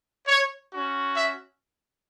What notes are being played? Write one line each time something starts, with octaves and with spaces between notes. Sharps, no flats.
C#5
C#4 F#4
E5